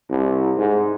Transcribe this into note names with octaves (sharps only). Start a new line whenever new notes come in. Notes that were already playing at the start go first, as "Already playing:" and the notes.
C2
G#2